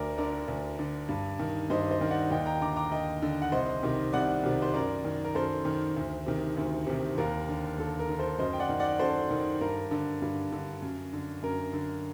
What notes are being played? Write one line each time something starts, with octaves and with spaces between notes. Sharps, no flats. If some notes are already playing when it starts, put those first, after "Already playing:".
Already playing: D2 A#4 D5
D3 A#4 D5
D2
D3
G2
D#3
G2 C5 D#5
C5 D#5
D#3
D5 F#5
D#2 D#5 G5
G5 A#5
D3 A#5 D6
A#5 D6
D#2 D#5 G5
D3
F#5
C2 C5 D#5
C3 D#3
C2 D5 F#5
C3 D#3
C5
F#2 A#4 D5
D#3
A#4
F#2 A4 C5
D#3
D2
C3 D#3
D2
C3 D#3
D#2 A#4
D3
D#2 A4
A#4
D3
A4 C5
F#2 C5 D#5
G5
D5 F#5
D#3
D5 F#5
F#2 A4 C5
D#3
G2 A#4
D3
G2
D3
F#2
D3
F#2 A#4
D3